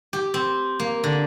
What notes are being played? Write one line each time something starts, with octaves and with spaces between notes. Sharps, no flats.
G4
C4
A#3
D3